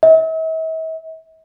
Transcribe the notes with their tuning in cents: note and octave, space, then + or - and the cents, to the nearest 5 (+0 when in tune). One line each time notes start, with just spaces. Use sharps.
E5 -45